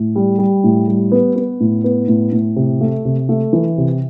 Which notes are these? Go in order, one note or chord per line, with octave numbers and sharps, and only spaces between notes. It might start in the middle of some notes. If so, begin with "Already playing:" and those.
Already playing: A2
G3
G3
A2
G3
B3
B3
A2
B3
A2
A2
C3
A3
C3
A3
E3
C3